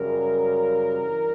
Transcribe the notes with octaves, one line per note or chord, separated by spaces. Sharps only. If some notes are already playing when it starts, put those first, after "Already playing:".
Already playing: F#2 C#3 G3 A#4
G2 E3 G3